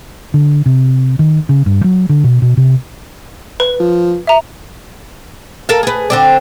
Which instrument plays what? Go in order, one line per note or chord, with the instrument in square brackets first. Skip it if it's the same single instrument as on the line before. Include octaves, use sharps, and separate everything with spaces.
[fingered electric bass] D3
C3
D#3
C#3
G2
F#3
D3
B2
B2
C3
[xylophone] B4
[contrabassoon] F3
[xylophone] E5 A#5
[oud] A4 A#4 F5
G#4 B4
D3 C4 D5